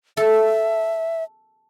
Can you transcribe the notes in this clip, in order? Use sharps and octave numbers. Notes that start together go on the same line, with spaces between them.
A4 E5